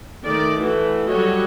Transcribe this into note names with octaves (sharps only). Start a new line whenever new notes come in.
D#3 A3 D5
E3 A3 F#4
F#3 G3 F#4 A4 C#5 D#5